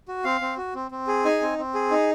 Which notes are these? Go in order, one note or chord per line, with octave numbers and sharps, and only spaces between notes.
F#4
C4 F5
C4
F#4
C4
C4
G#4
D#4 G#5
C4
C4
G#4
D#4